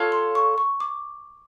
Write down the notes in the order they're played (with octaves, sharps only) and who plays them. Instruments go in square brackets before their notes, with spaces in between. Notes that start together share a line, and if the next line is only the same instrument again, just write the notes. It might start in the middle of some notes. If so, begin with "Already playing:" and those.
Already playing: [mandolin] F4 A4 C#5
[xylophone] C6
C#6
C#6
D6